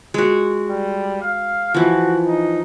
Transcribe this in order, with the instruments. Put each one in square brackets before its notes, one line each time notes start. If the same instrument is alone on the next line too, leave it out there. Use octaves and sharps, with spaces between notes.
[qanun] G#3 F#4
[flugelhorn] G3
F5
[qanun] E3 F3 [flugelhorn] F#4
[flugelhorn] D#4